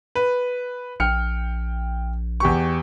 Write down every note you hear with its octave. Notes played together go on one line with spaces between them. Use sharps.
B4
A#1 G5 F6 C#7
E2 G4 C#6